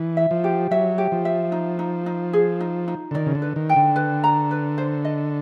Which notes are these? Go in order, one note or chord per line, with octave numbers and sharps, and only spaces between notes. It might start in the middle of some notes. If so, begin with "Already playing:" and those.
Already playing: E3
E5
F3
G4
F#3 E5
G4
F3
E5
D#4
D#4
D#4
G#4
D#4
D#4
D3
D#3 D5
C#3
D3
B4
D#3
G5
D3
B4
A#5
B4
C5
D#5